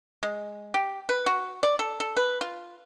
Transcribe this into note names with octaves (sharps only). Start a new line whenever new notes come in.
G#3
G4
B4
F#4
D5
A4
A4
B4
F4